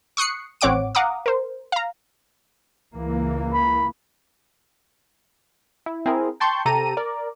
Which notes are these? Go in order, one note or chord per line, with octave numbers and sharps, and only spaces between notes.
C#6 D#6 F#6 C7 C#7
A1 C4 C#5 F#5 D6 D7
F5 F#5 A#5 D6 D#6
A#4 C5
F5 A#5
C#2 E3 A#3
B5
E4
C4 E4 G#4 A#4
G5 A5 C6 C#6 G6
C3 G4 A4 A#5 D#7
A#4 D5